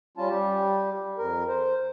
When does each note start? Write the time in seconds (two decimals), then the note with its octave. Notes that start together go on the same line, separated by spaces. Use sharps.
0.17 G3 C#4 F4 A5
0.29 G3 G4
1.18 F2 A#4
1.48 C5